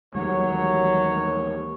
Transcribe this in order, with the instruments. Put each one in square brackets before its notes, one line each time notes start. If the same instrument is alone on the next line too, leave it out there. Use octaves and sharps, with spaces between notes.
[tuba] D#2 [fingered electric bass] D#3 E3 G#3 [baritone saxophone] F#3 [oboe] C#5